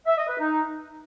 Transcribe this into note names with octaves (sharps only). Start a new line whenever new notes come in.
E5
D#5
B4
D#4